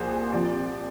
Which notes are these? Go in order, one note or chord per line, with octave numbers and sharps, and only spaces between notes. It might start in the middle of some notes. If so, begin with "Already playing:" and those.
Already playing: C2 A#2 F3 G#4 C5
C3 F3 D5